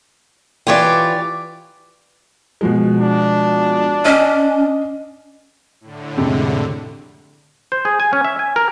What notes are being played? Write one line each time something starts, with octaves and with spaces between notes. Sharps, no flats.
E3 F4 G4 C#5 D5
B2 F3 G#3
D4
C#4 D#5
A2 D3
F2 C3 G#3
C5
G#4
G#5
C#4
E5
G#5
A#4